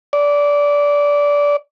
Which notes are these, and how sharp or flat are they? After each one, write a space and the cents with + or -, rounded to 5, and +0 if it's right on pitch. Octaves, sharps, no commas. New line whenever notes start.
D5 -20